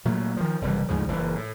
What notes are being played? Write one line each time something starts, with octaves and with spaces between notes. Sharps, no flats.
A#2 F#3 A3
D#3 F3
F#1 C2 E3 G3
D2 G#2 C#3 F3
F#1 E3
A2